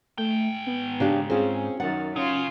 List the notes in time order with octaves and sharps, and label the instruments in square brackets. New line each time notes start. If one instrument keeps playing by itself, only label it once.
[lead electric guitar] G#2 G5 [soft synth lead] A3
[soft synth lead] B3
[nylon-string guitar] C#3 D4 G4
[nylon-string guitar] C4 F4 [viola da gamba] C#4 [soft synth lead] G#4
[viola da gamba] F#2 D#3 [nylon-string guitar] F#5 [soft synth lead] A6
[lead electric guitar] C#3 [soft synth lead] C#4 [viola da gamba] F4